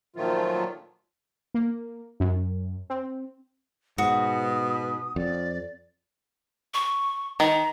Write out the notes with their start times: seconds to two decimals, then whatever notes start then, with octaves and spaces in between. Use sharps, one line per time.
0.16 A#2 D#3 F3 F#3 A3 F4
1.54 A#3
2.20 F#2
2.90 C4
3.98 G#2 B2 F#4 D#6
5.16 F2 D5
6.74 C#6
7.40 D#3 A#5